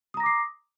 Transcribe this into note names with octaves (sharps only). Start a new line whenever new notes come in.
A#5 D6 D#6 A#6 C7